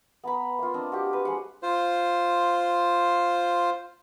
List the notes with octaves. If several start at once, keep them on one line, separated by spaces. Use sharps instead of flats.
B3 A#5 B5
A#3 F4
C4 D4 D#5
F#4 G4
B4
G#3 C5 F#5
F4 C5